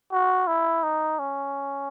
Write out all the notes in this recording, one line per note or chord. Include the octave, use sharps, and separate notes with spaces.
F#4
E4
D#4
C#4